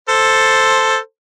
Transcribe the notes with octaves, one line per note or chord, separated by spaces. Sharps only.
A4 C5